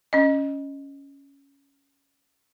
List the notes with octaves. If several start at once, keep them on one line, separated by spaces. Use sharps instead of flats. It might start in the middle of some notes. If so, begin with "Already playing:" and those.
C#4 D#5